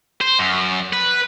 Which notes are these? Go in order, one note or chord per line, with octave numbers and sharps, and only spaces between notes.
C5
F#2
B4